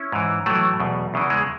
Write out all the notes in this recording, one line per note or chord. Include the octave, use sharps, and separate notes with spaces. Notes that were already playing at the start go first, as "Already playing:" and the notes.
Already playing: C#4 E4
G#2 E3
A2 E3 F#3 A3
E2 B2
E2 C#3 E3
G#3